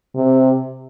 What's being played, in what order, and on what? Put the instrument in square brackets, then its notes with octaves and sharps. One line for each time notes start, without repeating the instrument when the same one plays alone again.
[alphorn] C3